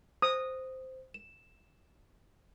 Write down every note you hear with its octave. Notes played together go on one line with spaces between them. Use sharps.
C5 D#6
E7